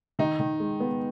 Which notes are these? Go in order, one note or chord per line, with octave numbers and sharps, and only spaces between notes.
D#3 D#4
D#3
G#3
B3